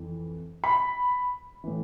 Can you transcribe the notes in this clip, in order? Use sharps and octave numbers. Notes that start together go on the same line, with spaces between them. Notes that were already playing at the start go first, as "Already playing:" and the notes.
Already playing: F2 E3
B5
A2 E3